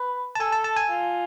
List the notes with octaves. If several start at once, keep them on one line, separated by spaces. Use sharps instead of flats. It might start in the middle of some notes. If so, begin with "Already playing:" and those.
Already playing: B4
A5
A4 G#5
A5
A5
G#5
F4